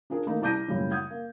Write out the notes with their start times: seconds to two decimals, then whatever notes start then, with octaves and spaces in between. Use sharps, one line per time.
0.10 D4 F4 G#4 A#4
0.27 D#3 A3 A#3 D#4
0.42 C2 A5 D6 G6 A#6 D#7
0.68 A#1 F#2 A2 C#3 G3
0.91 F#5 D#6 G6 G#6
1.11 A#3